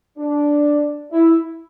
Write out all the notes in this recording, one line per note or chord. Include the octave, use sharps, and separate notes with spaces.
D4
E4